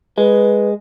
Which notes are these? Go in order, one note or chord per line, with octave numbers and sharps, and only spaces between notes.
G#3 B4